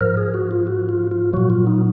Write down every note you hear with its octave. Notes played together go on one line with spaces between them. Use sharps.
G#2 F3 A#4
G#4
F#4
F4
F#4
F4
F4
A#2 F#3 F#4
F4
D#4